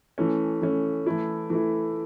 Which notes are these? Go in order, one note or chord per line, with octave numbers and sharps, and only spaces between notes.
E3 A3 C#4
E3 A3 C#4
E3 A3 E4
E3 A3 E4